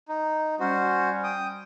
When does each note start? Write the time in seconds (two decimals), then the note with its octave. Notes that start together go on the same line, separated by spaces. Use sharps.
0.09 D#4
0.60 G3 C#4 F#4 C5
1.24 G5 D#6